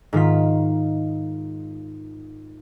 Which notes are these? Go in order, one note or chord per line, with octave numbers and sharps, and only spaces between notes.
G#2 D#3 F4 B6